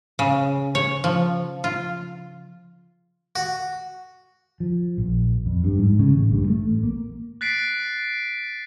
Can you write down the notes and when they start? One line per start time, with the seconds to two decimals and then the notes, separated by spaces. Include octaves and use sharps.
0.19 C#3
0.75 C#5
1.04 F3
1.64 F4
3.36 F#4
4.60 F3
4.98 A#1
5.46 F2
5.64 G2
5.79 G#2
5.99 C#3
6.14 A1
6.32 G2
6.48 A3
6.67 A1
6.83 A#3
7.41 F#6 A6 B6 C7 D7